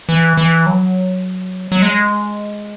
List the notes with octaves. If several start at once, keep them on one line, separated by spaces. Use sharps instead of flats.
E3
E3
F#3
F#3
G#3